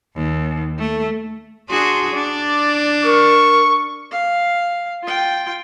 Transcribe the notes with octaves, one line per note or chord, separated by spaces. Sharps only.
D#2
A3
D4 F#4 G#4 C6
D4 D5
A#4 C#6
F5
F4 G5